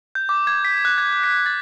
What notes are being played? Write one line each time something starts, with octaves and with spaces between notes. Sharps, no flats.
G6
D6
G#6
B6
F#6
G#6
B6
A6